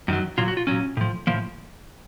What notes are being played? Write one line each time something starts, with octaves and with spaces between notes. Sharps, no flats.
F#2 D#3 F#3
A#2 F#3 F4
F#4
F4
A#2 F#3 C#4
A2 F3
A2 F3 A#3